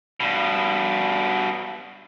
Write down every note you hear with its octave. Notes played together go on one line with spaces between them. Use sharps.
G2 B2